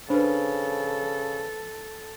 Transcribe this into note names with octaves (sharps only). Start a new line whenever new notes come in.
C#3 D4 A4 B4 C5